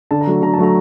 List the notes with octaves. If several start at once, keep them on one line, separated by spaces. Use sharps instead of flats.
D3 A5
A#5
F#3 A3
D3 A#5
A5
F#3 A3 A#5